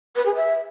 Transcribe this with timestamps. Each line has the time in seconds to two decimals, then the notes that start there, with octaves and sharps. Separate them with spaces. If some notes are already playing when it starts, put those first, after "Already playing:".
0.16 B4
0.26 G#4
0.35 E5